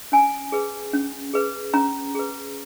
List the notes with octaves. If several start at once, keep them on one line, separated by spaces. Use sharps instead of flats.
C#4 G#5
G#4 B4
C#4
G#4 B4
C#4 A#5
G#4 B4